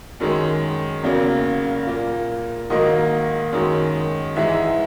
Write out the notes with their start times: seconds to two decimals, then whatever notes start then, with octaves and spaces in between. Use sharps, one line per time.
0.20 F#2 D#3 G#3
1.03 E2 C#3 F#3 A#3
1.87 A#2 A#3
2.70 G#2 D#3 F#3 A#3 D#5
3.52 F#2 D#3 G#3
4.36 G#2 E3 G#3 E5